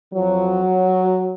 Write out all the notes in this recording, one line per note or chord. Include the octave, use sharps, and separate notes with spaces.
F2 F3 F#3